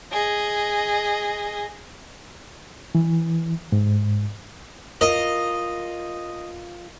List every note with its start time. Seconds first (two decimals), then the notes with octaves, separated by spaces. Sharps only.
0.12 G#4 D#5
2.95 E3
3.72 G#2
5.01 F4 A#4 D#5